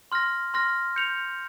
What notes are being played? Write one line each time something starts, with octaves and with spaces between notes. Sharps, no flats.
C6 F6 A#6
C6 F6 A#6
G6 C#7 F7